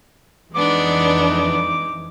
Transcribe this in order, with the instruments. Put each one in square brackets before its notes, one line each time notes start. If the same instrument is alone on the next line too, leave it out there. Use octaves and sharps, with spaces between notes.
[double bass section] F2 E3 [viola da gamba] G#3 D#4 [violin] B3 D4 [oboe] D6